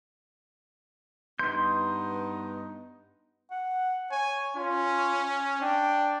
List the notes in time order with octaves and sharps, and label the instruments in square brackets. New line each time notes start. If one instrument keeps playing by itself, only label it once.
[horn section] G2 B3 D#4 [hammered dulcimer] C6 [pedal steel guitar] G6
[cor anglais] F#5
[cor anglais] C#5 [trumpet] G#5
[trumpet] C#4 [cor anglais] F4
[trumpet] D4 [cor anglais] G5